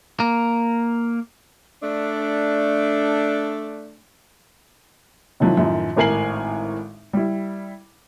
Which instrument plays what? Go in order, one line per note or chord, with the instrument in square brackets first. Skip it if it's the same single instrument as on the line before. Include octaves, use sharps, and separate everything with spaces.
[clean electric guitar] A#3
[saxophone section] A3 D4
[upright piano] C3 D#3 F3 F#3 E4
F#2 A2 D#3 F3
G#1 A2 A#4 G#5 C7 F#7
G3 E4